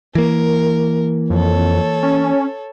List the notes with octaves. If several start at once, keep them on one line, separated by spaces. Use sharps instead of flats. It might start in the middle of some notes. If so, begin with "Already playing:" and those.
E3 A#3 A#4
F2 A4 C#5
C#4